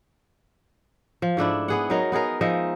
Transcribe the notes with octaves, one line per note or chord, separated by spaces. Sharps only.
F3
G#2 A3 D4 E4
B3 G#4 F#5
F#3 D#4 A#4
B3 D#4 G#4 A#4
F3 G#3 D#4 E5